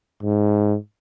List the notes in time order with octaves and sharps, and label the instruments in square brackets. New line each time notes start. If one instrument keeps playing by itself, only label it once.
[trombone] G#2